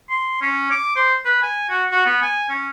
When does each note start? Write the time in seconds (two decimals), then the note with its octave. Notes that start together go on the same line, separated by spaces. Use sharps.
0.10 C6
0.41 C#4
0.71 D6
0.96 C5
1.25 B4
1.43 G#5
1.69 F#4
1.91 F#4
2.06 B3
2.22 G#5
2.49 C#4